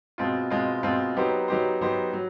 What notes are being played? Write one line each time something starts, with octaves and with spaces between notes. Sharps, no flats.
B2 G#3 C4 F4
B2 G#3 C4 F4
B2 G#3 C4 F4
F#3 B3 D#4 G4 C5
F#3 B3 D#4 G4 C5
F#3 B3 D#4 G4 C5
F#3